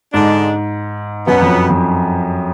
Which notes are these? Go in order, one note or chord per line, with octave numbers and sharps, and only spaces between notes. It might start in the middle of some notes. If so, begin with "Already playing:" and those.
G#2 D3 G#3 D4
F#2 B2 F#3 B3
F2
F2